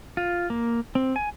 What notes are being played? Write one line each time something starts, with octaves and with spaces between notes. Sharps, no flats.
F4
A#3
C4
G#5